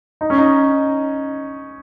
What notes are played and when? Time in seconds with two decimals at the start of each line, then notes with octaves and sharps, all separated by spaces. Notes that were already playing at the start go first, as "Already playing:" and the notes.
0.21 D#4
0.30 C#4
0.38 D#4